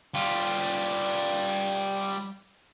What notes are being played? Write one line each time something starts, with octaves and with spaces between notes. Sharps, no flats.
G3 F4